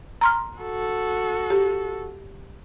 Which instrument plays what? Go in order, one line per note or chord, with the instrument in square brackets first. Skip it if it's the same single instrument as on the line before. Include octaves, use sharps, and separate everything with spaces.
[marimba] A#5 C6 F6
[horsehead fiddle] F#4 A4
[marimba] G4